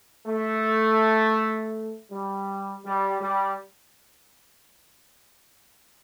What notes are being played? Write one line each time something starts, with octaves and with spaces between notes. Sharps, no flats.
A3
G3
G3
G3